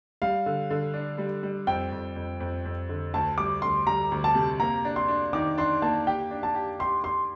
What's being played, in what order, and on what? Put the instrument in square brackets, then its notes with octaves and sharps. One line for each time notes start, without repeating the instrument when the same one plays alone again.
[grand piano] G3 [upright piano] F5
[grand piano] D3
D3
D4
G3
G3
[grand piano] F2 [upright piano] G5
[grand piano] F2
F2
F2
F2
D3
[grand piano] D2 [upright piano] A5
[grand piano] G3 [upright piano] D6
[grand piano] D2 [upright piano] C6
[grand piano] G3 [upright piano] A#5
[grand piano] D2
[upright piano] A5
[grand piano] C3
[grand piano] A#3 [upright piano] A#5
[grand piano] D4
[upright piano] C6
[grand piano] D4
[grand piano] D#3 [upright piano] D6
[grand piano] D4 [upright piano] C6
[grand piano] A#3 [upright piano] A5
[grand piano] G4 [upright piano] G5
[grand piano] D4
[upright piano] A5
[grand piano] G4
[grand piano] G4 [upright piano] C6
[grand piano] G4 [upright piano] C6